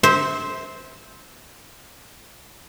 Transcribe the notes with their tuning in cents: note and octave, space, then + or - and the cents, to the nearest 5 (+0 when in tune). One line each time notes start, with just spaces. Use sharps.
C5 +0 E5 -25